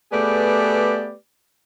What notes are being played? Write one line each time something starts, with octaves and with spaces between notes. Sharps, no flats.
A3 B3 G4 G#4 B4 D5